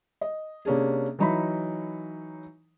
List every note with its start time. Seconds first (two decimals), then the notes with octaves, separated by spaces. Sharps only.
0.21 D#5
0.65 C3 A#3 C#4 D4 G#4
1.19 E3 F#3 D#4 E5 B5